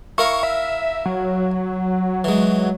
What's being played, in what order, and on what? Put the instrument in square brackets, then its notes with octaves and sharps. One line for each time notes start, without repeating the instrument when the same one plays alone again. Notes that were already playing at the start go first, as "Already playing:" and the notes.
[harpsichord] E4 A#4 F5 [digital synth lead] C#6
[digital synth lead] E5
F#3
[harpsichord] E3 G#3